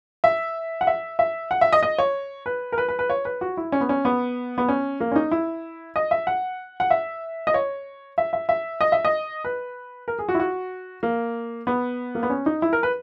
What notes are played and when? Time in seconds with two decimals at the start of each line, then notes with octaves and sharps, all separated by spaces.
0.24 E5
0.81 F#5
0.87 E5
1.19 E5
1.51 F#5
1.61 E5
1.73 D#5
1.83 D#5
1.98 C#5
2.46 B4
2.72 A#4
2.78 B4
2.88 B4
2.99 B4
3.10 C#5
3.25 B4
3.41 F#4
3.57 E4
3.72 C#4
3.81 B3
3.89 C#4
4.05 B3
4.58 B3
4.69 C#4
5.00 A#3
5.12 C#4
5.16 D#4
5.32 E4
5.96 D#5
6.11 E5
6.27 F#5
6.80 F#5
6.91 E5
7.47 D#5
7.54 C#5
8.18 E5
8.33 E5
8.49 E5
8.81 D#5
8.92 E5
9.05 D#5
9.44 B4
10.08 A#4
10.19 G#4
10.29 F#4
10.35 E4
10.40 F#4
11.03 A#3
11.67 B3
12.15 A#3
12.23 B3
12.30 C#4
12.46 D#4
12.62 E4
12.73 A#4
12.83 B4